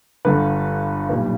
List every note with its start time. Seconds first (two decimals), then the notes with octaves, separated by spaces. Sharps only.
0.25 G1 G2 D3 B4
1.09 B1 A#2 G3 B4